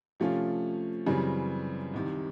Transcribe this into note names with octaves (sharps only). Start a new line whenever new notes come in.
C3 F3 A3 C#4 F4
F#2 C#3 E3 G3 C4
C2 C3 D#3